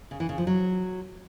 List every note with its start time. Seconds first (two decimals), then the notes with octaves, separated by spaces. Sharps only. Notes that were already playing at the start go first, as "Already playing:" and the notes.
0.11 C#3
0.20 E3
0.29 C#3
0.38 F3
0.47 F#3